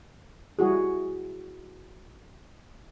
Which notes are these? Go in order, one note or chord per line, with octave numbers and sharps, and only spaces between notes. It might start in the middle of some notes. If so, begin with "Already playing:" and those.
G3 E4 F#4 G#4